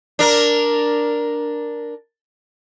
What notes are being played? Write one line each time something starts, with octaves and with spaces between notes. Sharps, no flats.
D4 A#4